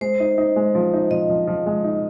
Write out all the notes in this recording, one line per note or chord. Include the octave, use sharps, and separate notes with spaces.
G#3 C5
D#4
D#4
G#3
F3
D#4
F3 D#5
F3
F3
G#3
D#4